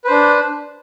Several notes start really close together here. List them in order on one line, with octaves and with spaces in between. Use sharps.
B4 C5 D4